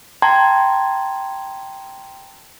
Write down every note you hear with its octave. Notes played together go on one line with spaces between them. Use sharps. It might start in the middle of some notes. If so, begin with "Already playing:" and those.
G5 A5 A#5 C6 G#6